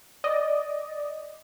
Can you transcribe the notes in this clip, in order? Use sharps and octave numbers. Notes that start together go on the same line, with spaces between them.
D5 D#5